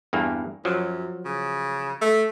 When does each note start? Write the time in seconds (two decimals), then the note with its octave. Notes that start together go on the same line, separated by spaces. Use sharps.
0.13 E2 G2 A#3
0.65 F#2 F3 F#3
1.26 C#3
2.02 A3